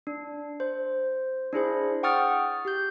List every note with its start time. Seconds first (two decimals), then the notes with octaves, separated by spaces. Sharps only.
0.07 D4
0.60 C5
1.53 D4 E4 G#4 C5
2.03 F#5 G5 C#6 D#6 F6 A6
2.65 G4 G6